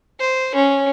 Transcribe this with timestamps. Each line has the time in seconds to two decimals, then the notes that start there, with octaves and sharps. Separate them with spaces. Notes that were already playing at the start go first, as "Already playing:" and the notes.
0.20 C5
0.55 C#4